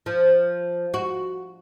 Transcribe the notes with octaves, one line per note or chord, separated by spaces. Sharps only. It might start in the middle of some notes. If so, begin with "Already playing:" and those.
F3
F#4